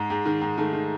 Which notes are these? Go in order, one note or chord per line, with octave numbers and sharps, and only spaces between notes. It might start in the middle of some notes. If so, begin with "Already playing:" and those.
Already playing: G#2 G#3
G#2
D#3
G#2
D#3 A3
D#3